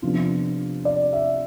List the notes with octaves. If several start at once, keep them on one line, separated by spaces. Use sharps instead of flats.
C3 F3 B3 D4 F4
D5
E5